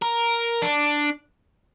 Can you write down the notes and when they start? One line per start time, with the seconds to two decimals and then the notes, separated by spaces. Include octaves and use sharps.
0.02 A#4
0.62 D4